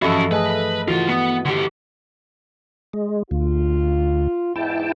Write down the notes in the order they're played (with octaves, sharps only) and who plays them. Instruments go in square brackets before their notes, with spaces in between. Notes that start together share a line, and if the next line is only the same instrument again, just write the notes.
[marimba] G2 E3 F3 [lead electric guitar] C#4 F#4 [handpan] A4 D#5 E5
[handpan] A3 D#5 [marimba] G#4 G#5 A5 [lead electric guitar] B4
[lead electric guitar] C#2 F4 [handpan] E3 F#4
[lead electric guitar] B3
D3 G4
[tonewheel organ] G#3
[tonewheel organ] D2 [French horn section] F4
[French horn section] E2 G#2 [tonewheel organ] E4 G5 A5